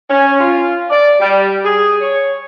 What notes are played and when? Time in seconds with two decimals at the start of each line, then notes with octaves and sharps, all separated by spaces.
0.10 C#4
0.40 F4
0.90 D5
1.20 G3
1.65 G#4
2.00 C#5